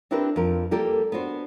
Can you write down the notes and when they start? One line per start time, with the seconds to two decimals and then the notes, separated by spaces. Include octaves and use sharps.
0.11 C4 D4 E4 G4 A#4 B4
0.36 F2 A#4
0.71 G3 A#3 G4 A4 A#4
1.12 B3 D4 F#4 C5